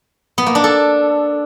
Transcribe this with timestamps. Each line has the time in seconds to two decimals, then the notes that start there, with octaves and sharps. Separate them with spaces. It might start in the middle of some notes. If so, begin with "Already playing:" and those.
0.38 B3
0.46 A#3
0.55 D4
0.64 A4